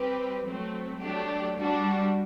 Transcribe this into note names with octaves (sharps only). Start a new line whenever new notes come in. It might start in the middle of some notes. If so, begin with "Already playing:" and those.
Already playing: G3 C4 G4 B4
F#3 A3 C4
F#3 A3 D4 G4
G3 D4 F#4